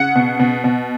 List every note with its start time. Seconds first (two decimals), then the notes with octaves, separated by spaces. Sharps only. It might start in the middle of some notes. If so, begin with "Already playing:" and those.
Already playing: C#3 F#5
0.16 B2
0.40 B2
0.64 B2